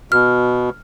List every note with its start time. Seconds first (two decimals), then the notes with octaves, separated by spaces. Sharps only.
0.12 B2 F6